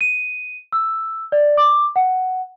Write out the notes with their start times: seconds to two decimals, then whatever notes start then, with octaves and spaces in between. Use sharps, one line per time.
0.01 D#7
0.72 E6
1.32 D5
1.57 D6
1.96 F#5